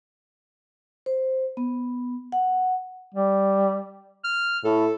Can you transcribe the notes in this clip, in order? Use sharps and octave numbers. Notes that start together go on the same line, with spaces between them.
C5
B3
F#5
G3
F6
A2 A4